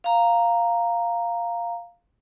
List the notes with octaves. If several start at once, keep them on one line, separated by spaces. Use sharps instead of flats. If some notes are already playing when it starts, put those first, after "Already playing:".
F5 A#5